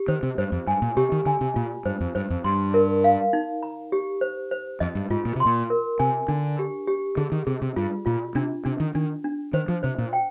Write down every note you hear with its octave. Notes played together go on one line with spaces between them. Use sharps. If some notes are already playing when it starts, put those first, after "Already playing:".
Already playing: G4
D#3 C5
C3
G2 C5
F2
G2 G#5
A#2
C3 G4
D#3
D3 G#5
C3
A#2 F4
G2 C5
F2
G2 C5
F2
G2 C6
A#4
F5
D#4
A#5
G4
C5
C5
F2 D#5
G2
G#2 F4
A#2
C3 C6
A#2
A#4
C3 G#5
D3 D4
G4
G4
D3 G#4
D#3
C3 G#4
C3
G2 F4
A#2 F4
C3 D4
C3 D4
D#3
D#3 D4
D4
D#3 C5
F3
C3 C5
A#2
G5